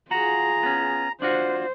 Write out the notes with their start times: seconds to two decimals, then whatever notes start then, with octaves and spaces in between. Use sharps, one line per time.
0.11 F4 F#4 G#4 A#5
0.63 B3 C#4
1.22 D4 F4 F#4 C5